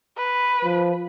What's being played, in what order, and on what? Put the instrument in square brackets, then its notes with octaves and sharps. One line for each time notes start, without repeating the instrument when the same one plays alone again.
[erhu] B4
[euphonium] F3